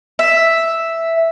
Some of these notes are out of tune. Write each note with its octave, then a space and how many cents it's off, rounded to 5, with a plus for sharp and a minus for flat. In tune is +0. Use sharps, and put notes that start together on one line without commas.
E5 +0